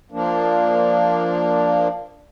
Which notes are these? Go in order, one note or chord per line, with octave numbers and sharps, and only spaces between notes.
F3 A#3 D4